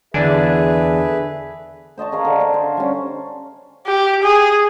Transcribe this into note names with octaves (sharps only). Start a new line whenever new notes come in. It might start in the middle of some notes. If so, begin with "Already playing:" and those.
E2 D3 D4 G#4 B4 E5 G#5
C5 D#5 A5 C#6
G#4 A#4 F5
D3
D4
C5
G3 C#4
G4
G#4